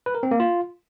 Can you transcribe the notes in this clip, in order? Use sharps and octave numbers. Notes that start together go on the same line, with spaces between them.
B4
A#4
C4
A#3
F4